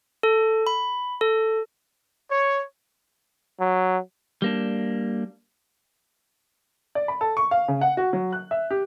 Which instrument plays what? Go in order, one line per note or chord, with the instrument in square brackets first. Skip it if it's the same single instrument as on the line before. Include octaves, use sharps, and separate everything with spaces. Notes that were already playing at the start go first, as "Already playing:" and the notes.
[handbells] A4
B5
A4
[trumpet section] C#5
[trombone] F#3
[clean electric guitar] G3 A#3 D4
[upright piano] D5
B5
A4
C#6
F5
C#3
F#5
F#4
F#3
F#6
E5
G4